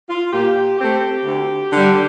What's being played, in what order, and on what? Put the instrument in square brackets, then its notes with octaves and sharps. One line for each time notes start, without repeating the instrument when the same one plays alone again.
[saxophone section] F4
A#2 G4
A3 C4 G4
D2
D3 G3